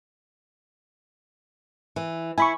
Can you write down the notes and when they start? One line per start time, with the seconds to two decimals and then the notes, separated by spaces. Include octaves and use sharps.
1.96 E3
2.38 E4 G#5 B5 C#6